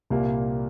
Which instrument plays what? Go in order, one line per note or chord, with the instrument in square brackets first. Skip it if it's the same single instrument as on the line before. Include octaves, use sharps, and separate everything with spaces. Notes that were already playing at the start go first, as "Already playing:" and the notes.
[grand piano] C2 A#2 G3 A#3